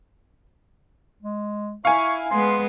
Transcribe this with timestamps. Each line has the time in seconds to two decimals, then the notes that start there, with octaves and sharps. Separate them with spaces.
1.22 G#3
1.85 E4 F5 G#5 C#6
2.31 G#3 B3 C6